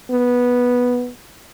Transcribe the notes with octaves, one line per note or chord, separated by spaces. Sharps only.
B3